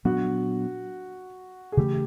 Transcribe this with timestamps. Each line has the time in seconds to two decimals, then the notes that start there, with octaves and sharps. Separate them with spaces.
0.05 A#2 F#3 B3 D4 F#4
1.72 G#4
1.77 C#3 E3 A3 G4